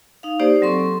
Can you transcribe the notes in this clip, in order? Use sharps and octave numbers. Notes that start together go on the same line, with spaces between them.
D#4 F5
A#3 D#4 G4 C5 D5
F#3 C4 A4 C6 C#6